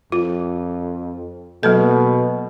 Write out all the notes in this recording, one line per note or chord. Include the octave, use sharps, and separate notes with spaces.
F2 F4
B2 F#3 A#3 A4